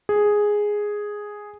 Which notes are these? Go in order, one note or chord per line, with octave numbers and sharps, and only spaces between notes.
G#4